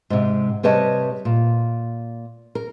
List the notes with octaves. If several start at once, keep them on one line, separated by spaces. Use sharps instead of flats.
G#2 C3
C3 G3 B4 C#5 D#5 A5
A#2
A#4